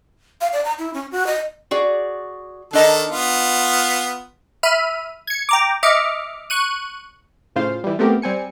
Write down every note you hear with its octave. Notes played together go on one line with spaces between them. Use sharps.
F5
D5
A#5
E4
C#4
F#4
D#5
F#4 G#4 D5
D#3 D4 A4 D#5 A#5
B3 F4
E5 B5 F6 D#7
G#6 C#7
G5 A#5 D6
D#5 E5 D6 F6 C#7
C#6 F#6 D#7
A2 C#3 F4 C5 F5
E3 G3
A3 B3 C4 G4 A#4
G3 C4 G#5 C#7